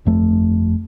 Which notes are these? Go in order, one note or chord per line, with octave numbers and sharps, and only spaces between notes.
G1 F2 A3